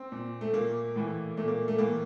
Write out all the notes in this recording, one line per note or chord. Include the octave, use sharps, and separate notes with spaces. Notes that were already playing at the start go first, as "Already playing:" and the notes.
Already playing: C4
A#2
A3
A#2 A#3
A2 E3
A#2 A3
A#3
A3
A2 E3 A#3